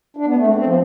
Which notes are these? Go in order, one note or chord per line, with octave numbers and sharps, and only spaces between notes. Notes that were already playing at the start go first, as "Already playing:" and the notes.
D4
B3
A3
C4
C4
F3